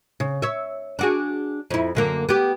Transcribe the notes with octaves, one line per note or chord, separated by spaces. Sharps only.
C#3
C#5 E5
D4 F#4 G#4
F2 E4
F#2 D3 A#3
B3 G4